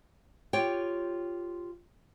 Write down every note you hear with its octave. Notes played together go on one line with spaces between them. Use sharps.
F4 G4 C#5 G5